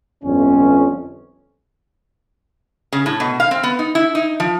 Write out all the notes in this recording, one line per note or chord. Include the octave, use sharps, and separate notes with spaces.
G1 F2 C#4
C#3
A2
B2
F5
C4
B3
D#4
E4
D#4
F3